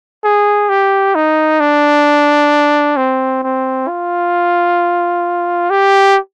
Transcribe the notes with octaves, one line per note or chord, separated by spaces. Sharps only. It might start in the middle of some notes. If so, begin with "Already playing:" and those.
G#4
G4
D#4
D4
C4
C4
F4
G4